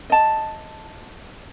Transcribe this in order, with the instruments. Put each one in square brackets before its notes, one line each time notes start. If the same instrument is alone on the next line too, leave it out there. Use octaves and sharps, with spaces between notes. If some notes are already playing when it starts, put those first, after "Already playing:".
[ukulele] D#5 A5